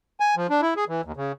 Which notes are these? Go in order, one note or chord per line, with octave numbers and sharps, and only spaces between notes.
G#5
F3
D4
E4
G#4
E3
D#2
C#3